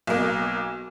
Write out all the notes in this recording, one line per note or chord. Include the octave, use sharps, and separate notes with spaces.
B1 A#3